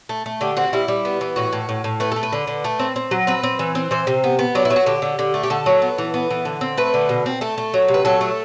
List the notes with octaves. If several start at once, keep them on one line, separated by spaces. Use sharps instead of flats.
A3
A3
D3 G4
C4 F#4
G3 E4
G3
B3
E3
A2 F#4
A2
A2
A2
A3 B4
A3 A4
B4
D3
D3
A3
C4
C4
F#3
C4 B4
C4
E3
C4
E3 C5
C3
B3
B3
F#3 D4
E4
F#3
F#4
D3 G4
D3
D3
A3
G4
D3 A4
F#3
B3
E3
B3
E3
D3
C4
A3 B4
D3
B2
C4
A3 A4
A3
F#3
C3
B4
F#3 A4
A3